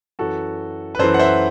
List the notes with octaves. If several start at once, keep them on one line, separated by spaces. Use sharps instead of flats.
F#2 E3 F#4 A4
B4
F#2 E3 A4 C5
F#5
C5 E5